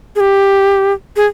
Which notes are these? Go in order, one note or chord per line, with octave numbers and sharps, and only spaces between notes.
G#4
G4
G#4